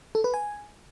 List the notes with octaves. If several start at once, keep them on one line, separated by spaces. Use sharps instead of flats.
A4
B4
G#5